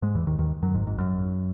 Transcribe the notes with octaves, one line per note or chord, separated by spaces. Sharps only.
G#2 G#3
E2 E3
D#2 D#3
D#2 D#3
F#2 F#3
G#1 G#2
G#1 G#2
F#2